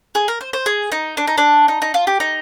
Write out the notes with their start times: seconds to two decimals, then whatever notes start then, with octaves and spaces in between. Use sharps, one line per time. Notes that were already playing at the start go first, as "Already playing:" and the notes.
0.15 G#4
0.28 A#4
0.41 C5
0.53 C5
0.66 G#4
0.92 D#4
1.17 D4
1.27 D#4
1.38 D4
1.68 D#4
1.82 D#4
1.94 F4
2.07 G4
2.20 D#4